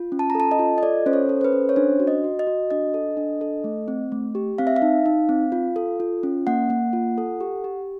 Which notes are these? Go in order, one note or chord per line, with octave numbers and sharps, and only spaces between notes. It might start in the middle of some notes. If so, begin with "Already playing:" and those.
Already playing: F4
C#4
A5
A#5
A4 A5
D#5
F4
D#5
A4 D5
C#4 C5
C#5
A4
C5
B4
C#4
C#5
D4 C5
F#4
D#5
F#4
D#5
F#4
D4 D#5
A4
D4
A4
A3
C4
A3
G4
C4 F5
E5
F5
D#4
D#4
C4
F4
A4
F4
C#4
A#3 F#5
A#3
F4
A4
G4
G4